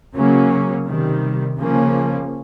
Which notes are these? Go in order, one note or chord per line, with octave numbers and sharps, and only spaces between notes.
C#3 F#3 A#3 C#4
C3 D#3 G3
C#3 F3 A#3 C#4